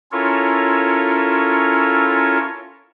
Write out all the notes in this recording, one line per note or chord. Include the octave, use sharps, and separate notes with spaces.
C#4 E4 F4 A4 A#4 C#5